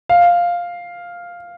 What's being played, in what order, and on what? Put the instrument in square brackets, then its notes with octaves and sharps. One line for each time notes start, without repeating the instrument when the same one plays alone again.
[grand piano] F5